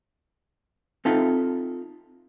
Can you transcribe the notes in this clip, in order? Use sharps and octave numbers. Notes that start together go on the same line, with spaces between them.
C4 D#4 F4 A4 E5 F5